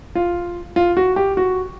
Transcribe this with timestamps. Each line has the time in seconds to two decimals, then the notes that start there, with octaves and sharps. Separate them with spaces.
0.15 F4
0.76 F4
0.97 F#4
1.16 G4
1.37 F#4